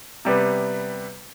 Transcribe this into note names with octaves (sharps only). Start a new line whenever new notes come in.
C3 G3 B3 B4